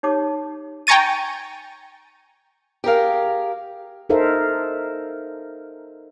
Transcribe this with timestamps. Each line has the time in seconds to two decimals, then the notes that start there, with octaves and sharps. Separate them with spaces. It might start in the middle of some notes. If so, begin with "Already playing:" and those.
0.03 D#4 G4 C#5 A5 D6
0.87 G5 G#5 A#5 C#6 A6 D#7
2.84 G4 G#4 A#4 F5
4.09 D#4 A4 A#4 C5 E5 F5